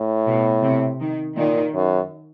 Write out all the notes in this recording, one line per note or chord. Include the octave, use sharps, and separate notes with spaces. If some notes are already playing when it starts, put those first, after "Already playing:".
Already playing: A2
B2
C3
D#3
A#2 D#3
F#2